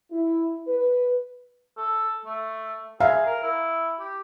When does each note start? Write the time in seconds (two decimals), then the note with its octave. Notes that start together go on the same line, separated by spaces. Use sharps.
0.12 E4
0.67 B4
1.77 A4
2.25 A3
3.00 G#4 E5 F5 A#5
3.26 A#4
3.43 E4
4.00 G4